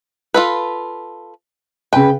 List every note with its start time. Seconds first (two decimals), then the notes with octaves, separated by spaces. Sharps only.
0.34 F4 A4 B4
1.93 C#3 B4 G5